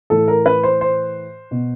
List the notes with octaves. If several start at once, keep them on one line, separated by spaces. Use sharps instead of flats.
A2 E3 A4
A#4
B4
C5
C5
B2